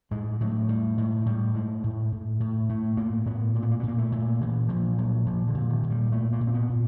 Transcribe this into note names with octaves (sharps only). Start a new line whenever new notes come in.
A2 G#3
A2 F#3
A2 G3
A2 G#3
A2 G3
A2 G#3
A2
A2
A2
A2 A3
A2 A#3
A2 B3
A#2 A#3
B3
A#3
B3
A#2
A#3
A3
A#2
A#2 E3
A#2 F3
A#2 F#3
A#2 F3
D3
A#2
D#3
A#2
G3
A#2 A3
A#3
A#2
C4
B3
A#2